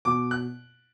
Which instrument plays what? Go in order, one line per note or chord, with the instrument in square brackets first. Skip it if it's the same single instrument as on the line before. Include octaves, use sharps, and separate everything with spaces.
[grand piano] B2 D6
F#6